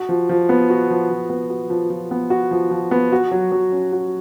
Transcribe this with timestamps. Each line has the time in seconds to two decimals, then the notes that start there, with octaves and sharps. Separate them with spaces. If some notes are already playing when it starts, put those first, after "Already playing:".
Already playing: F#4
0.09 F3
0.29 F3
0.49 B3
0.70 F#4
0.90 F3
1.10 F3
1.30 B3
1.50 F#4
1.70 F3
1.90 F3
2.11 B3
2.30 F#4
2.51 F3
2.71 F3
2.91 B3
3.12 F#4
3.31 F#3
3.52 F#3
3.72 C#4
3.92 F#4